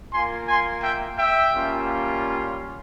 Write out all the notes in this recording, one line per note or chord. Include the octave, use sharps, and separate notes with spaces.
A#3 F4 G#5 C6
G#5 C6
E5 G5
E5 G5
G3 A#3 C#4 F4